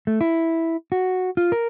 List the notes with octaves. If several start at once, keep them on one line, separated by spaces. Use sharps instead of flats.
A3
E4
F#4
F4
A#4